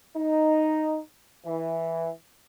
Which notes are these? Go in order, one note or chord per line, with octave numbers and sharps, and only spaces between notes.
D#4
E3